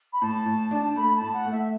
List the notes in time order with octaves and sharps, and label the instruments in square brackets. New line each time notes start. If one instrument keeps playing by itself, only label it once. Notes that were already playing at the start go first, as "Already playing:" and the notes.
[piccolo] B5
[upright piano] A2 [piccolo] A5
[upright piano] A2
D4
[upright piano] A3 [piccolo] B5
[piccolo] A5
[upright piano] A2
[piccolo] F#5
[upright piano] A3
[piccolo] E5